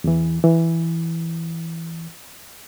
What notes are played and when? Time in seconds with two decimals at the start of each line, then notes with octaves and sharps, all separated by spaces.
0.04 E2 E3
0.44 E3